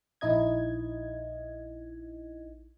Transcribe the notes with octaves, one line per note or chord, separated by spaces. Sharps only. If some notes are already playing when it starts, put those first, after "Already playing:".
A#1 D#4 E4 D#5 G#6